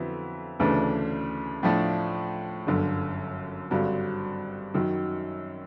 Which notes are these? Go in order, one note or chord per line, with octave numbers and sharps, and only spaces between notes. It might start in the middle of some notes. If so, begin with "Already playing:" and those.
Already playing: F2 D3 F#3 B3 E4
D2 C#3 E3 A3 D4
A2 F3 A3 D4
G1 F#2 D3
G#1 G2 D3 F#3
F#2 D#3 F#3